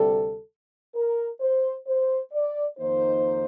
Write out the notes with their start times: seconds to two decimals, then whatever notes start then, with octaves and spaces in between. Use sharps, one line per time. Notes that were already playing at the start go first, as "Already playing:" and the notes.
Already playing: D2 C3 G3 A4
0.95 A#4
1.40 C5
1.87 C5
2.32 D5
2.79 F2 D#3 A#3 D#4 C5